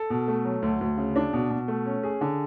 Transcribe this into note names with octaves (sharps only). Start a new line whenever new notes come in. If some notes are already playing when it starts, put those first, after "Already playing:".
Already playing: A4
B2
A3
F#3
D2
D2
C#3
D4
B2
B2
A3
C#4
G#4
D3